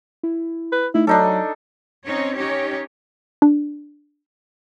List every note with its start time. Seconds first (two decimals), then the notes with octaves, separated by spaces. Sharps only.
0.23 E4
0.72 B4
0.94 A3 D#4 E4
1.07 F#3 D4 D#4 A4 D6 F#6
2.06 C4 C#4 D#4 C#5
2.36 C#4 D#4 G4 C#5
3.42 D4